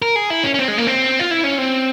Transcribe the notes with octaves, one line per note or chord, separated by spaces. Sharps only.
A#4
G#4
E4
C#4
C#4
C4
G#3
A#3
C4
F4
E4
C#4
C4